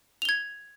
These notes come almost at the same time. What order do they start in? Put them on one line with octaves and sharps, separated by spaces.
F7 G7 G#6